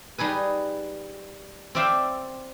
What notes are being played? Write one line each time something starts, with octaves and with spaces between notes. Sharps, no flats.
G3 D#4 G#4 B4
C4 C5 D5 E5 F5 G5